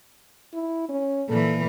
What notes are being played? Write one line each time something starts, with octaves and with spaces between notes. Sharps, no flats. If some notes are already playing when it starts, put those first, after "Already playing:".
E4
C#4
A#2 E3 A4